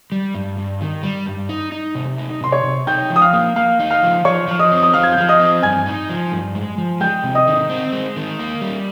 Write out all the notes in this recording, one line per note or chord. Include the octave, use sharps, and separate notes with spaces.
G3
G2
G2
D#3
G3
G2
D#4
D#4
C3
D#4
C3 C6
C#5 C#6
C3
D#4 G5 G6
F3
D#6
F5 F6
A#3
A#3 F5 F6
D#4
F5 F6
F3
F3 C#5 C#6
F3 F6
D#5 D#6
C4
D#6
F3 F5 F6
G#6
G6
F3 F6
D#5 D#6
C4
G2 G#5 G#6
D#4
F3
G2
G#3
F3
G#3 G5 G6
C3
D#5 D#6
D#3
C4
G#3
D#3
A#3
G3